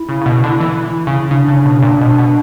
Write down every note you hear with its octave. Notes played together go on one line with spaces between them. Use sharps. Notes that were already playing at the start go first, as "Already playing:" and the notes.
Already playing: E4
C#3
C#3
B2
D3
E3
C#3
C#3 D4
C#3
B2
A#2
B2
B2